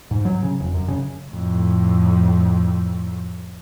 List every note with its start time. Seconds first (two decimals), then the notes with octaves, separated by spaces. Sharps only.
0.11 G#2
0.25 F#3
0.43 C#3
0.60 F1
0.74 F#2
0.88 C#3
1.28 F2 A2